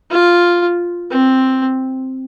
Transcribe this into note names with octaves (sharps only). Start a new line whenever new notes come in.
F4
C4